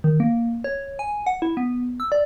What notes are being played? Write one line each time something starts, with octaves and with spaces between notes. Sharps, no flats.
D#3
A#3
C#5
G#5
F#5
E4
B3
E6
D5